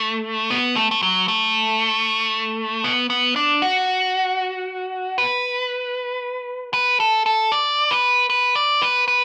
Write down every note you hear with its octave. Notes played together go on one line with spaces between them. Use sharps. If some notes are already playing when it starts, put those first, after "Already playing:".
Already playing: A3
B3
A3
A3
F#3
A3
B3
B3
D4
F#4
B4
B4
A4
A4
D5
B4
B4
D5
B4
B4